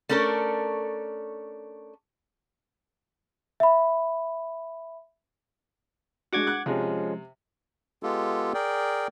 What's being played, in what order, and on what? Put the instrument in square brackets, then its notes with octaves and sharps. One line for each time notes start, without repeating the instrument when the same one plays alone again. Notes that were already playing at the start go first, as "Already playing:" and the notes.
[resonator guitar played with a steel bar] A3 C#4 D4 A4 A#4
[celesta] E5 B5
[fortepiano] G#3 D4 F#4 [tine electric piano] F#5 D6 G#6
[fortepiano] F#6
[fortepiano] C3 [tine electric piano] F3 G#3 C#4
[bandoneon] G#3 B3 F4 G4 A4
G#4 A#4 D5 G5